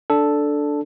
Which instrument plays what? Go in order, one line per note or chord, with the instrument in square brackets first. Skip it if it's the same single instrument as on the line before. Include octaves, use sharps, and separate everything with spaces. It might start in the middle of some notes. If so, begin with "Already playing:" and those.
[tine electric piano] D4 A4